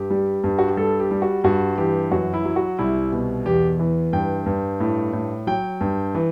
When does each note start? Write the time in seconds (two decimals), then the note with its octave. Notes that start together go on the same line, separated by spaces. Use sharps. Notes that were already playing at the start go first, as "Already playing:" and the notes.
Already playing: G2 G4
0.10 G3
0.44 G2
0.59 F#4
0.68 G4
0.77 G3 A4
1.00 G4
1.11 G3
1.22 F#4
1.44 G2 F#4
1.78 E3 G4
2.11 F#2 F#4
2.34 E4
2.45 F#3
2.56 F#4
2.79 C2 E4
3.12 B2
3.46 E2 G4
3.79 E3
4.13 G2 G5
4.46 G2
4.80 A2
5.13 A2
5.47 F#3 G5
5.81 G2
6.15 E3